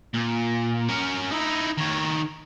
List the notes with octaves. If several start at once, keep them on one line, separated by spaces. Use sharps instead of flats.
A#2
C#4 A#4
D#4 E4
D#3 C#5